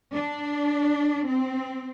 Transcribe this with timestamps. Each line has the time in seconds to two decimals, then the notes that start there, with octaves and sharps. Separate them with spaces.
0.13 D4
1.26 C4